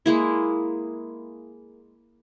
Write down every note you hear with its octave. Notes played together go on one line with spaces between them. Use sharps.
G#3 A#3 E4